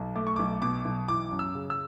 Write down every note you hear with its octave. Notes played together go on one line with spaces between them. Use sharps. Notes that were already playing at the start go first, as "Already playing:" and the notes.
Already playing: B1
A3 D6
C#6
B1 D6
B2 D6
B1
E3 D6
F#2
E6
C#3
E6